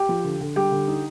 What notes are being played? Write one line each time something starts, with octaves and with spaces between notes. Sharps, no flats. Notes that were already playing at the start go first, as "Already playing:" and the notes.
Already playing: G4 G5
F3
D3
D3
G3 G4 G5
D3
D#4